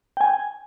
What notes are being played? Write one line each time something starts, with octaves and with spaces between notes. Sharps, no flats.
G5
G#5